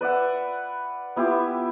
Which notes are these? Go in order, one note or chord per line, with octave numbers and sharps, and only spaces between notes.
B4 D5 E5 F#5
B3 E4 F4 G4